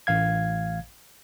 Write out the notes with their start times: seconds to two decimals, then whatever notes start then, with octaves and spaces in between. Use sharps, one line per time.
0.07 A1 F5 G#6